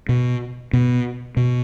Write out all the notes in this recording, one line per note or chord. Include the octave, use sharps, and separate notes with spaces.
B2
B2
B2